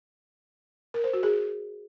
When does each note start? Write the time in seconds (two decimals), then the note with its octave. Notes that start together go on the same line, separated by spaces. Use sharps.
0.94 A#4
1.04 C5
1.13 F#4
1.23 G#4